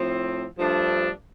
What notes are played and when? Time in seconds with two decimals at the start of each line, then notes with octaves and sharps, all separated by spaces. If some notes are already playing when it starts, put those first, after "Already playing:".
Already playing: A2 F3 C4
0.58 G2 F3 A3 D4